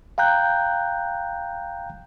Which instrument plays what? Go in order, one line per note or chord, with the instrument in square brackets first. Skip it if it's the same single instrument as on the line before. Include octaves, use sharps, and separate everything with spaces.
[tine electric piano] F5 G5 A#5 F#6 G6